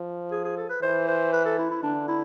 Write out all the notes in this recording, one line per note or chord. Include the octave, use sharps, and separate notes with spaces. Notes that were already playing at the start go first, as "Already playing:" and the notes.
Already playing: F3
G#4
G#4
A4
B4
E3 C5
C5
B4
A4
E4
E4
D3 D4
E4